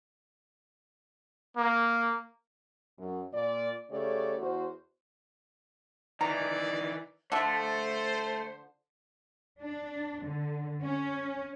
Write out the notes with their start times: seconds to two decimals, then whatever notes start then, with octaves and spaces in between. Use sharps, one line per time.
1.57 A#3
2.98 F#2
3.33 A#2 D5
3.91 C#3 A3 G4 C#5 D5
4.38 E2 F#4 C5
6.21 D#3 E3 D5 A#5
7.32 D3 F3 A3 C5 E5
9.60 D4
10.23 D3
10.82 C#4